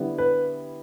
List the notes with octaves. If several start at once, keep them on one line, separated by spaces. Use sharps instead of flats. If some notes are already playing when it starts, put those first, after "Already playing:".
Already playing: D3 G3 B3 E4
B4